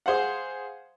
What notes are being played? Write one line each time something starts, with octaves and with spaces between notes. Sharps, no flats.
G#4 C5 F5 F#5